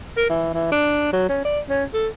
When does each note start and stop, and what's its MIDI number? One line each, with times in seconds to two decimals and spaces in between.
0.17 0.25 70
0.30 0.51 52
0.54 0.68 52
0.72 1.11 62
1.13 1.29 54
1.29 1.40 61
1.45 1.60 74
1.69 1.84 61
1.94 2.08 69